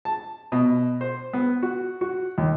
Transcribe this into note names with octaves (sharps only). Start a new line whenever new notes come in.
A5
B2
C5
B3
F#4
F#4
D#2